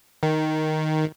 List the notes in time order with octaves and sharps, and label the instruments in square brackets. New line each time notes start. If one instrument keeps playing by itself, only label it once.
[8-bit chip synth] D#3